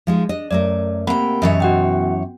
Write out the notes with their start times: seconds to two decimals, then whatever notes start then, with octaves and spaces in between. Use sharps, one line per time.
0.07 F3 G#3 D#4
0.29 D4 D#5
0.51 F#2 A3 A#4 D5
1.07 C3 A#3 A#4 F#5 G5 B5
1.42 F#2 B2 E3 C#5 D#5 E5
1.60 F#4 F#5 G5